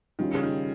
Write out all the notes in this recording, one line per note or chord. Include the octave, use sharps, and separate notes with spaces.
D#3 G3 C#4 F4
C#3
D#3